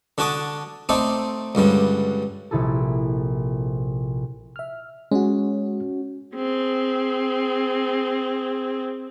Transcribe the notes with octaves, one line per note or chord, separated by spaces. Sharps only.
D3 D4 F#4 A5 D6 D#6
A3 C4 D#4 A4 D5
C#2 G2 D3 G3
A#1 C3 E4 G#4 A4
E5 F6
G#3 C#4 F#4
C4 G#4